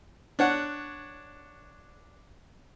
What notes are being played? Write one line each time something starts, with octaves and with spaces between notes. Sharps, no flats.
D4 C#5 F#5